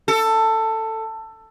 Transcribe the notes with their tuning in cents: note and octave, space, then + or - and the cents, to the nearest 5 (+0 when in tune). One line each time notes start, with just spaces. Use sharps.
A4 +15